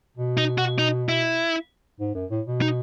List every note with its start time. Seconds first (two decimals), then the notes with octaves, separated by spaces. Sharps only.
0.17 B2
0.37 D#4
0.58 F#4
0.78 D#4
1.09 E4
2.00 G#2
2.15 F#2
2.31 A2
2.47 B2
2.62 D#4